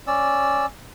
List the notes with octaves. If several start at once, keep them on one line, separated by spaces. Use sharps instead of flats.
C#4 D5 E6